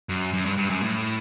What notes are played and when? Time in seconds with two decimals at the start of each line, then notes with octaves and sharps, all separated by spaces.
0.09 F#2
0.34 F#2
0.46 G2
0.57 G2
0.70 F#2
0.82 A2